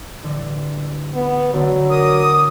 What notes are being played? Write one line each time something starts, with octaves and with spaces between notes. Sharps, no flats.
A1 D3 G3
B3
D3 F#3 A3
A#4 D6 D#6